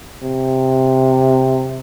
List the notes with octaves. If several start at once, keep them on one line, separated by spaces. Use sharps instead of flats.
C3